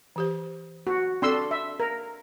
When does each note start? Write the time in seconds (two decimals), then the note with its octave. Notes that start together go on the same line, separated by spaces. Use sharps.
0.16 E3 G4 C5
0.87 F#4
1.22 C4 D4 A4 C6 E6
1.51 E5
1.80 A#4